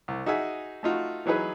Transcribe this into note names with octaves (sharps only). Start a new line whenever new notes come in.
C2
D#4 F#4 G#4 E5 G#5
A3 D#4 F4 F#4
E3 F#3 D#4 G#4 B4